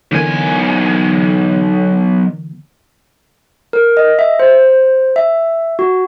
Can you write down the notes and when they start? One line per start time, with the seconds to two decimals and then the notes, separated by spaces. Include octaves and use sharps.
0.11 B1 D3 E3 A#3 G#5
3.73 A#4
3.97 D#5
4.19 E5
4.39 C5
5.16 E5
5.79 F#4